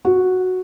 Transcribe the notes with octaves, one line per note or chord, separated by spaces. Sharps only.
F#4